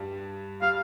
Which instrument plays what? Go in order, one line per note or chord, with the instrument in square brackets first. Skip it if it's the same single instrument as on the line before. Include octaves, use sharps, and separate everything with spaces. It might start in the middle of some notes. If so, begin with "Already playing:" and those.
Already playing: [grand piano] G2 G3
[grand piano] G3 [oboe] F5